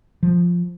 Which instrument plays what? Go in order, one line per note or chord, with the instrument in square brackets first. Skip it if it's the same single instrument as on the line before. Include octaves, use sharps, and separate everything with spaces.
[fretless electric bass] F3